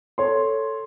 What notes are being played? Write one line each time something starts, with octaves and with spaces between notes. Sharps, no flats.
A4 C#5 C6